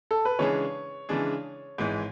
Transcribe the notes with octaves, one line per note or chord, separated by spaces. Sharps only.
A4
B4
C#3 E3 G#3 D4 G#4 C#5
C#3 E3 G#3 D4 G#4
G#1 G#2 E3 G#3